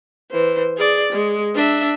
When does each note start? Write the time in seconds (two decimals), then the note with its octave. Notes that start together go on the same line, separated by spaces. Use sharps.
0.31 E3 C5
0.77 G#4 D5
1.13 G#3
1.55 D4 E5